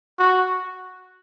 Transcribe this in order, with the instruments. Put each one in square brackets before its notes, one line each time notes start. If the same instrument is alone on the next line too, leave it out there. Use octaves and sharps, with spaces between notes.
[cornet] F#4